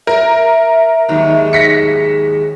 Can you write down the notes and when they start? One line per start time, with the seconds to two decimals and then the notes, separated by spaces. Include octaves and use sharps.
0.07 A#4 E5
1.08 D#2 G#2 F#3
1.53 A#6 B6 C#7